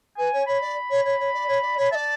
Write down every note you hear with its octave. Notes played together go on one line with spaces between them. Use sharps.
B4 G#5
C#5
C#5 B5
D5
C#5
C#5
C#5
D5
C#5
D5
C#5 B5
D5 E5 A5